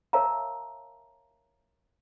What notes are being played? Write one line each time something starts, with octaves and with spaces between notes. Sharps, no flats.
A#4 C#5 E5 F5 A5 A#5